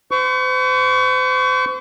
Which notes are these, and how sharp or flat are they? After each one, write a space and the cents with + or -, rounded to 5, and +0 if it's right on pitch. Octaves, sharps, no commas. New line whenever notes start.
C5 -40 C#6 +25